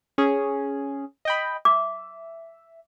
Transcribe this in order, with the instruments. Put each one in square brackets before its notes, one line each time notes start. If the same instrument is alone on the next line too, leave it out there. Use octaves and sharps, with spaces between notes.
[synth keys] C#4 G#4
D#5 G5 B5
[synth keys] E5 [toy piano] D6